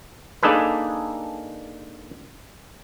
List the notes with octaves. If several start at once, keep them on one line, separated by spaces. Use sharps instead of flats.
A#3 D4 D#4 G#4 A4 B4